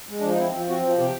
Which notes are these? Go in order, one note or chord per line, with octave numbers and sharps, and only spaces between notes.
G#3
F3 D4
D#4
C4 E4
F3
C4 F#4
F3
C3 G4